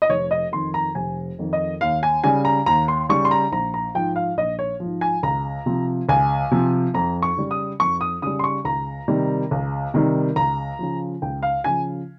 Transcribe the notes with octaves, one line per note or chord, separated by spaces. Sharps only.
D#5
F1 C#5
D#5
F2 D#3 C6
A#5
F1 G#5
F2 D#3
D#5
D#2 F5
G#5
C#3 G3 G#5
A#5
D#2 A#5
C6
C#3 G3 C#6
C6
A#5
A#1 A#5
A#5
G#2 F3 G5
F5
A#1 D#5
C#5
G#2 F3
G#5
C#2 A#5
C3 F3
C#2 G#5
C3 F3
F2 A#5
C#6
C#3 G3
D#6
F2 C#6
D#6
C#3 G3 D#6
C6
C#6
C#2 A#5
C3 D#3 G3
C#2
C3 D#3 G3
C#2 A#5
C#3 F3
C#2 G5
F5
C#3 F3 G#5